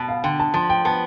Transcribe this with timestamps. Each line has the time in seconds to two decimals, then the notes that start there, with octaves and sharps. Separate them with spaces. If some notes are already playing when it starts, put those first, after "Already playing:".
Already playing: B2 A5 B5
0.09 F5
0.24 D3 G5
0.40 A5
0.54 F3 A5
0.70 G5
0.85 B3 A5